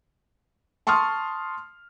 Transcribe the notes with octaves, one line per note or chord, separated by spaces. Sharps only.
A5 C6 C#6 D#6 F6